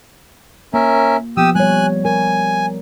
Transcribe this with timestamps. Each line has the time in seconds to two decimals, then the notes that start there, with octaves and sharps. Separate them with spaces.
0.74 A#3 C#4 A#4 E5
1.37 F3 B3 G4 D#6 E6
1.55 G3 C#5 G#5 F#6
2.05 A#4 G#5